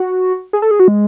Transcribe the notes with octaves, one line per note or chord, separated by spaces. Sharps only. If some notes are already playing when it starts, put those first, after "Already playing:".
Already playing: F#4
G#4
A4
G#4
F#4
G#3